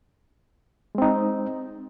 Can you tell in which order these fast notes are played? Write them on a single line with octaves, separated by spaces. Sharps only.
G#3 C4 D#4